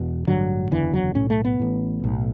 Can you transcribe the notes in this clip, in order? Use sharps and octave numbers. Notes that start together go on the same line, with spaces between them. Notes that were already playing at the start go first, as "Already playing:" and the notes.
Already playing: E1 E2 B2
A1 G2 D3 F#3
F#1 E2 D3 E3
F#3
B1 A2 C#4
A3
B3
A1 A2
B1 A2